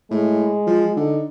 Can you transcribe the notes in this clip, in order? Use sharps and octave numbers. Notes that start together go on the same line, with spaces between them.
A2 G#3
F3
D3 D#4